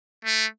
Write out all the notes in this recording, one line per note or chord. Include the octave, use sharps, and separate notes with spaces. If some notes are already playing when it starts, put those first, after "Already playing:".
A3